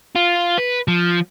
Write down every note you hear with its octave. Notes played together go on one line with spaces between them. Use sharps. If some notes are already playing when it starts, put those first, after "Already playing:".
F4
B4
F3